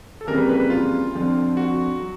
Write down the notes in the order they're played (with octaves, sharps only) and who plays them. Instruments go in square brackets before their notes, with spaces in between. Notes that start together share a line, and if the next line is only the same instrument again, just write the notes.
[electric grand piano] A4
[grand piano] F2 C#3 E3 G3 A#3 [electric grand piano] A#4
[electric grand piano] B4
B4
B4
F4
[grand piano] F2 D3 F3
[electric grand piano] F#4
[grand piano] F#3